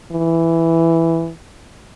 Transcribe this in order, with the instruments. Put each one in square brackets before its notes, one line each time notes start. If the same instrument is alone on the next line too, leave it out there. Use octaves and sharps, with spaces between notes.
[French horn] E3